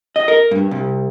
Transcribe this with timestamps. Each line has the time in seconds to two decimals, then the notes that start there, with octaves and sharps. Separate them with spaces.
0.16 D#5
0.28 A#4
0.51 G2
0.71 C2